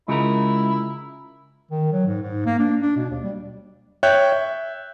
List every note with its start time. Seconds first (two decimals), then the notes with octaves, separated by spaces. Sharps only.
0.08 C#3 G#3 E4 F4 A#4
1.71 D#3
1.92 F#3
2.06 G#2
2.22 G#2
2.46 A#3
2.59 D4
2.82 D4
2.96 B2
3.10 D#2
3.23 G3
4.03 C#5 E5 G5 F#6 G6
4.32 E5